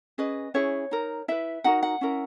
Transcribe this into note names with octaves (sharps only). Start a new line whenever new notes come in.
C#4 G#4 B4 D#5
C#4 E4 G#4 C#5
D#4 A#4
E4 B4 E5
D#4 F#4 A#4 F#5
F#5
C#4 E4 A#4